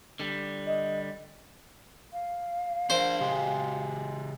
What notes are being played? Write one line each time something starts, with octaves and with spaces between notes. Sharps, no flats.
D3 G3
D#5
F5
D4 A#4 C5
C#3 G#3 G4 G5